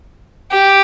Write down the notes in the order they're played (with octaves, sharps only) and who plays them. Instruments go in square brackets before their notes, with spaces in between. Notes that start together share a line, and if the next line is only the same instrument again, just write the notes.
[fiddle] G4